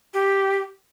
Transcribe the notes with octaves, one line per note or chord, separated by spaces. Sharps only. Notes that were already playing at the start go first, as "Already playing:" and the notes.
G4